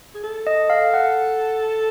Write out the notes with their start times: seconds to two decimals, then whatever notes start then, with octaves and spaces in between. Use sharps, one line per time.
0.15 G#4
0.23 A4
0.47 D#5
0.70 A4 F5
0.94 F#5